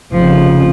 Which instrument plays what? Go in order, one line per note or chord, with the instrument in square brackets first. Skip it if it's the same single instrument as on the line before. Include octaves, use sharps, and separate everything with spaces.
[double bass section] F1 F2 C#3 [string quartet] F3